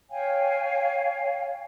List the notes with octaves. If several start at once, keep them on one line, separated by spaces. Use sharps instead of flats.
C#5 F5 G5 G#5